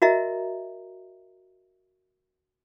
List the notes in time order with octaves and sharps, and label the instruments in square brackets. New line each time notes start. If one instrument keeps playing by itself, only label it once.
[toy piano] F#4 A#4 D#5 E5 A#5